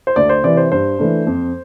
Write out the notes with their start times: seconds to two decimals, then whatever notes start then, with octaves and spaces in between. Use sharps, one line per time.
0.07 C5
0.16 D2 D5
0.29 C5
0.43 C3 E3 D5
0.57 C5
0.71 G2 C5
0.99 E3 A3 D4
1.27 F2